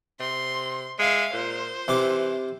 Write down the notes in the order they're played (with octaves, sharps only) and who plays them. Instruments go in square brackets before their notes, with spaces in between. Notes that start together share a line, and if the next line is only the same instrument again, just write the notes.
[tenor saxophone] C3 [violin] C6
[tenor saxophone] G#3 [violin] E5 F5
[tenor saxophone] A#2 [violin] C5
[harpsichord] C3 C6 D6 [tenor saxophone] E3